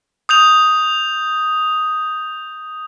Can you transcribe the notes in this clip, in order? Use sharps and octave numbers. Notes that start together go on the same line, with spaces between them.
D#6 G6 F7